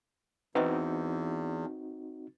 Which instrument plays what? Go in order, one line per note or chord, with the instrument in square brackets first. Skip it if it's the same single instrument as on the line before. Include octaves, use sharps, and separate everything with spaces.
[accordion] E2 [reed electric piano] C4 D#4 F#4 [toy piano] B4 D#5 E5